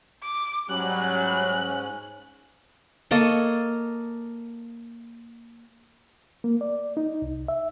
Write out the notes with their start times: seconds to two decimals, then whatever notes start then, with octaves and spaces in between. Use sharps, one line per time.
0.23 D6
0.70 G#2 F#3 G3 C#4 F#6
3.11 A#3 A4 C#5 D#5
6.44 A#3
6.61 D5
6.97 D#4
7.22 C2
7.48 E5